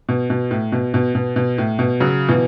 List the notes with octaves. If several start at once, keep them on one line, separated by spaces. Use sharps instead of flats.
B2
B2
A2
B2
B2
B2
B2
A2
B2
C#3 F#3
B2 E3